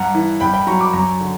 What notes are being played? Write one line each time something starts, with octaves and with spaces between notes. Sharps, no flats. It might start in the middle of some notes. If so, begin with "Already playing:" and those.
Already playing: G2 F#5 A#5
E3
G2 G5 B5
G5 B5
F#3 A#5 C#6
B5 D6
F#2 A#5 C#6
D3